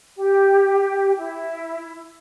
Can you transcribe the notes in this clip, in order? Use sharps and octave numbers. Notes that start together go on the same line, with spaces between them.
G4 G5
E4